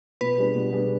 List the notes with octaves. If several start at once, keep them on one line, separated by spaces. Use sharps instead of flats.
B2 B4
G3 D4 G#4
B2
G3 D4 G#4